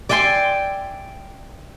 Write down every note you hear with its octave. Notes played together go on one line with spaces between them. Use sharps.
D5 E5 G5 G#5 C6